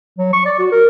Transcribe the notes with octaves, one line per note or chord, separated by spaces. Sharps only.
F#3
C#6
D5
F#4
A#4